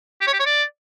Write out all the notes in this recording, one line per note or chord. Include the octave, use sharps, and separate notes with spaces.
G4
C#5
G4
C#5
D5